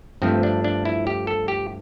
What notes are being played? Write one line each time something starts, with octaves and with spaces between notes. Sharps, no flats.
G2 F3 A3 C4
D4
D4
E4
G4
A4
G4